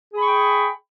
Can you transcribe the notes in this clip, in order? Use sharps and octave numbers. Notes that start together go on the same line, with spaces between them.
G#4 G5 B5 C#6